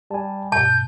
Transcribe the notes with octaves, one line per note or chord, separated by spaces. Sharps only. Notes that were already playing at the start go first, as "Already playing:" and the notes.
G3 G#5 A5
G2 B2 A5 G6